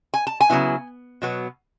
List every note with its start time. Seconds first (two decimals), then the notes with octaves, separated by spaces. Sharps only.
0.14 G#5
0.27 A5
0.41 G#5
0.50 C#3 F#3 B3 E4
1.22 B2 F#3 B3